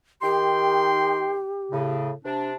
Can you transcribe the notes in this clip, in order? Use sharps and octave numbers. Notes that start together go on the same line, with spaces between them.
D#3 G4 G5 C6
A2 C#3
C3 D4